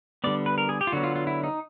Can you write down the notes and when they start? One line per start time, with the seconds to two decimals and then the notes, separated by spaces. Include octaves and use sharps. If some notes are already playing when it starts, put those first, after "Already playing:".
0.24 D3 G3 B3 D5
0.46 B4
0.58 A#4
0.69 G#4
0.81 G4
0.87 F4
0.92 D3 F#3 B3 F#4
1.03 F4
1.16 F4
1.27 E4
1.44 D#4